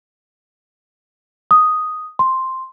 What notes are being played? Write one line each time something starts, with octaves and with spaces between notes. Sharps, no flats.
D#6
C6